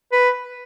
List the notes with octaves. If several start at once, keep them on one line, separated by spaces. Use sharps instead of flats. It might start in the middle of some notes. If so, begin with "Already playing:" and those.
B4